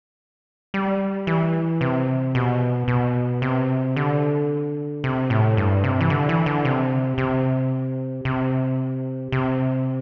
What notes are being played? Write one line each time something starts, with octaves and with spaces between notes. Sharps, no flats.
G3
E3
C3
B2
B2
C3
D3
C3
A2
G2
C3
E3
D3
E3
D3
C3
C3
C3
C3